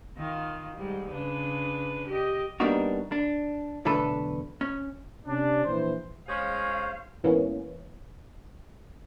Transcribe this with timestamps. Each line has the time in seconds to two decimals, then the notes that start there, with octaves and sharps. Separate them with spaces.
0.17 D#3 F4
0.76 G#2 G3
1.10 C#3 D4 B4
2.07 G4 D#5
2.60 G3 A#3 B3 D4 D#4 F#4
3.12 D4
3.85 B1 E2 D3 A3 A4 B4
4.61 C#4
5.26 C3 C#4 D4
5.65 A#1 E3 C5
6.28 G#3 C#4 G#4 C5 C#5 F5
7.23 G#2 E3 A#3 B3 C#4